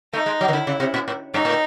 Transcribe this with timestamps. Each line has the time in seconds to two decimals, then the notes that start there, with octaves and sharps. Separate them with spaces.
0.13 A3 D#4
0.26 G#3
0.41 F#3
0.48 D#3
0.53 D3 E4
0.67 C#3
0.80 C3
0.94 A#2
1.08 A2
1.34 G2 D#4
1.45 A2